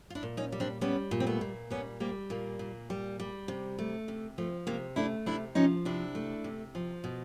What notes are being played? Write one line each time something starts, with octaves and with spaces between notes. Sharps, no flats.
F4
D4 E4
A#2
C#4 D#4
G3
C4 D4
G3 B3 C#4
A#2
C4
A3 B3
A#2
G3 B3 C#4
G3 A#3 C4
A#2 A#3
A#2
G3
G3
C3
A3
C3
F3 A3
C3 A#3
A3 D4 E4
C3 D4 E4
F3 C#4 D#4
C3 D4 E4
A3
C3
F3
B2